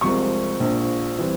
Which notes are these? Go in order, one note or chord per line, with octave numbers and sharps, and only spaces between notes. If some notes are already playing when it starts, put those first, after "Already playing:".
C2 C3 F3 G#3 C4 C#6
A#1 A#2 F3
E3 G3 C4